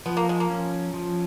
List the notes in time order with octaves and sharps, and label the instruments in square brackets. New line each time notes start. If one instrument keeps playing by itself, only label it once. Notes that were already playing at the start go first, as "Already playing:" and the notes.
[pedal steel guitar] F3 [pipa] B3
[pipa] A#3
G#3
A#3
[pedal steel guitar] C#4
F3